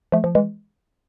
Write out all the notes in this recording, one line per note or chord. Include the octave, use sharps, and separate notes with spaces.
F3 A3
F3
E3 G#3